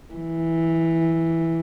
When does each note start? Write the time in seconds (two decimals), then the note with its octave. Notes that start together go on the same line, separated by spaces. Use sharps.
0.14 E3